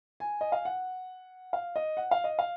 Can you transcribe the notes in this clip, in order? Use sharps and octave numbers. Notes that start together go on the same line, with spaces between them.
G#5
D#5
F5
F#5
F5
D#5
F#5
F5
D#5
F5